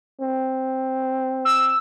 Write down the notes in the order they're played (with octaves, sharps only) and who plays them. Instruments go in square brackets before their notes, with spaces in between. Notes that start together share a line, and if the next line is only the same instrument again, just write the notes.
[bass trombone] C4
[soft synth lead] E6